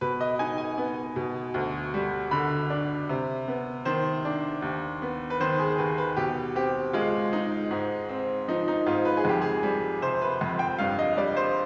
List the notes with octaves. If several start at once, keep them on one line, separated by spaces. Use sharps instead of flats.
B2 B4
D#5
D#4 G#5
G#5
B3
B2
D2
G3
D3 B5
D4
C3
B3
D#3 C5
D4
D#2
B3
B4
D#3 C5
G#4
D#2 B4
B4
B2 G4
C4 G4
G#3 F4
D#4
G#2
C4
F3 D#4
D#4
G#2 F4
B4
G#4
F2 G4
G#4
G3
C3 C5
B4
F2
G5
G2 F5
D#5
G3 D5
C5